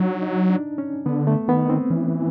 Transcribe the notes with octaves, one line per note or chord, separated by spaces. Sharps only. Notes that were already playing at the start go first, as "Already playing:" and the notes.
Already playing: F#3 D4 D#4
D#4
D4
C#4
D3 B3
A3
D#3 B3
C4
E3 C#4